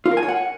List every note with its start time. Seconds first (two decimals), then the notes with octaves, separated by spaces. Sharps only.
0.06 F4
0.11 A#4
0.17 G#5
0.23 C#5
0.28 F#5